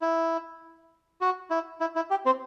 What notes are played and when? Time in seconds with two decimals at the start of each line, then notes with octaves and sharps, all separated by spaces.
0.01 E4
1.21 F#4
1.50 E4
1.81 E4
1.96 E4
2.11 G4
2.26 C4 C5